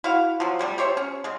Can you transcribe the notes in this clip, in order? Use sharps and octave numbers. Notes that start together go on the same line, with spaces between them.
E4 F#4 F5
F3 F#3
C3 G3 A3
G4 C5 C#5 E5
C#4
C#3 G#3